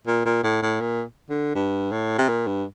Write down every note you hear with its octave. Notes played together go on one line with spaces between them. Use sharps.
A#2
A#2
A2
A2
A#2
D3
G2
A2
C3
A#2
G2